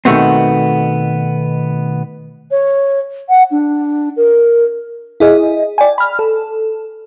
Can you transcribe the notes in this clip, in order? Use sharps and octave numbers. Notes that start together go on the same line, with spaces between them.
B2 D#3 E3 A3 B3 C4
C#5
F#5
D4
A#4
E4 G#4 D#5
D5 G5 G#5
B5 F6
A4